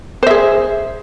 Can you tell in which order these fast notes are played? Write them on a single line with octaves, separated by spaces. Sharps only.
C5 E5 G#4